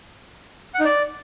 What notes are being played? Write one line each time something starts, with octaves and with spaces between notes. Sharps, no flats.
F#5
D#4
D5